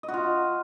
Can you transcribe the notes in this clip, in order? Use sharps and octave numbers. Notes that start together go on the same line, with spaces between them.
D#5
F#4
F4